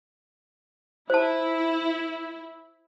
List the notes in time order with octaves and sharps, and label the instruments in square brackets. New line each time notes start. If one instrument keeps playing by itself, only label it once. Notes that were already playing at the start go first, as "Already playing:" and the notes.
[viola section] E4 [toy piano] C5 A5